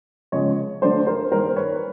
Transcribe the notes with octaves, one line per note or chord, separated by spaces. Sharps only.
C#3 F3 G#3 B3 C#5 D#5
D3 F#3 A3 C5 D5
A#4 C5
D#3 G3 A#3 A#4 C5
B4 C#5